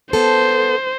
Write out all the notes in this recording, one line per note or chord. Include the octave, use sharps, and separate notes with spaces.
B3 A4 C5